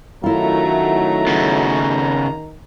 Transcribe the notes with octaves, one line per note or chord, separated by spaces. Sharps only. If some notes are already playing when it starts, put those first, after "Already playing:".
F#2 D#3 F#3 A3 E4 F4 A#5
C#3 B3